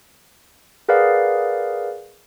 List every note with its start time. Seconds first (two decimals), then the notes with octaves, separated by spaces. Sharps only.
0.89 G#4 A#4 B4 D5 F5 F#5